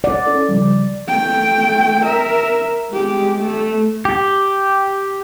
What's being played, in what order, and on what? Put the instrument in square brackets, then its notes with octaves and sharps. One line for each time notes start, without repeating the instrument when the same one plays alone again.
[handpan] D5 [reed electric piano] F#5
[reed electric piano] C#4 E4 A4
C#3 F3 G3
[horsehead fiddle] A3 G5
A#4 E5
G#3 G4
A3
[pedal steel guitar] G4